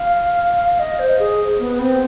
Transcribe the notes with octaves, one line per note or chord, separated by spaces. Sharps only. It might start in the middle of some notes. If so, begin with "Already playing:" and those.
Already playing: F5
D#5
C5
G#4
B3
C4